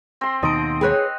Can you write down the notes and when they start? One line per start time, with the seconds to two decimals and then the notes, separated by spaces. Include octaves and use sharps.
0.21 C4 C6
0.43 D#2 B2 D#3 D#4 D#5 C6 D7
0.81 G#4 B4 C#5 G5 B5 F#6